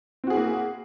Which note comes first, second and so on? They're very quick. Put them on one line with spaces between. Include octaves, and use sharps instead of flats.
C4 F#4 G#4 E4 A#3